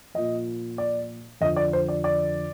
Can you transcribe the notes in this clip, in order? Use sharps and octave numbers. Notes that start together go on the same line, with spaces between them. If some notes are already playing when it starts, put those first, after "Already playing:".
A#2 F3 D#5
D5
F2 D3 F3 D#5
D5
C5
D5
D5